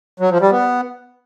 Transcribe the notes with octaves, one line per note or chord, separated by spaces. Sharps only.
F#3
F3
G3
B3